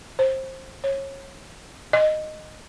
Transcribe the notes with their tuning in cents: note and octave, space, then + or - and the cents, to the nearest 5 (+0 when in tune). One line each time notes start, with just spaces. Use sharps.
C5 +20
C#5 -25
D#5 -10